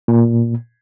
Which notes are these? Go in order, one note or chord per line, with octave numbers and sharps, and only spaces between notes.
A#2